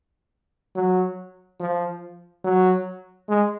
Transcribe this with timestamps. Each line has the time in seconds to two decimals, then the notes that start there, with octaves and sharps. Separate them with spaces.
0.75 F#3
1.60 F3
2.44 F#3
3.28 G#3